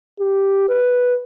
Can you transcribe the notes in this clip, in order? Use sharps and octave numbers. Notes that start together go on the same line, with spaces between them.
G4
B4